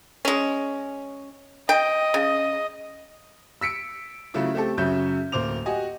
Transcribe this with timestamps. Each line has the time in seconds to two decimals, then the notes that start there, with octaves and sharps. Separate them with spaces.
0.25 G#3 C#4
1.69 D#5 G5
2.14 C#3
3.61 E6 B6 C#7 D7
4.34 C#3 F#3 A3 E4 F4
4.55 A3 C4 G4 A4
4.77 F#2 C#3 F#3 E5 G6
5.32 D1 A#3 C5 D6 F7
5.66 F#4 G4 D#5 F#5 G#5